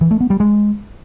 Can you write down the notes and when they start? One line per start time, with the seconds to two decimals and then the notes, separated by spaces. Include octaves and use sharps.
0.01 E3
0.11 A3
0.20 B3
0.30 G3
0.40 G#3